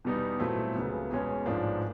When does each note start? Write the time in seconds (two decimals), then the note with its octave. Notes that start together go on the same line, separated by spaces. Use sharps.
0.04 E2 B2 G3 B3 D#4
0.39 A#2 F#3 A3 C4 E4
0.76 C#2 C#3 F#3 B3
1.10 E2 B2 G#3 C#4
1.46 A1 G#2 F3 A#3 D4